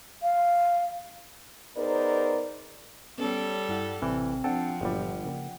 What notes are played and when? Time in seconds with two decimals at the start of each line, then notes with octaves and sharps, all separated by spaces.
0.22 F5
1.77 B3 D#4 G#4 A#4 C5 D5
3.18 G3 B3 C#4 A4 C#5
3.69 G2 E4 F#5
4.02 A1 C3 E3 C4
4.44 F3 C4 D4 A4 F#5 G5
4.81 G1 A#2 F#3 G3 E5
5.25 C#3 A#3